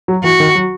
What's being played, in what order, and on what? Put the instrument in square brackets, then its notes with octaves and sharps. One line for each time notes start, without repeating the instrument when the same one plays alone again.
[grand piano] F#3
[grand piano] E3 [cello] F#4
[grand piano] D#3
F#3